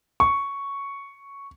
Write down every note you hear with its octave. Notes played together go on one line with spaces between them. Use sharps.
C#6